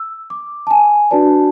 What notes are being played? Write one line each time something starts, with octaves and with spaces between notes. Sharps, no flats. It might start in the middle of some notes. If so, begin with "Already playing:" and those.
Already playing: E6
D6
A5
G#5
D4 F#4 B4 D5 A5